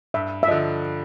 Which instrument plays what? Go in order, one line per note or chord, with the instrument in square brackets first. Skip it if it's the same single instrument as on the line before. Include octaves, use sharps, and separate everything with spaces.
[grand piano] G2 [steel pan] E5
[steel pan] E5
[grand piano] D3 F3 [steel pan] D#5